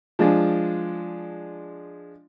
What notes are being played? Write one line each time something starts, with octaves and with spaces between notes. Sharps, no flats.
F3 G#3 D4